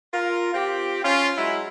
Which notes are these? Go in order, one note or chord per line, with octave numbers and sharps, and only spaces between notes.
F4 A#4
C4 F4 G4
C#4 F4
F#3 G#3 E4